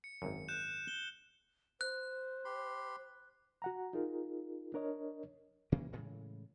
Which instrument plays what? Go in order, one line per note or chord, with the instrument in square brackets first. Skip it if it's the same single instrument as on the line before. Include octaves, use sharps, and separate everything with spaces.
[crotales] C#7
[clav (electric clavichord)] G#1 F#2
[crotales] F#6 G6 E7
G7
[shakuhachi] C5 [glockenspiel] F#6
[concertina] G4 B5 C6
[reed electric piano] F#4 F#5 A#5
D#4 F4 G#4 A#4
D4 A#4 C#5 D#5
[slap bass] C3 E3 A#3 C#4
A2 C#3 E3 G#3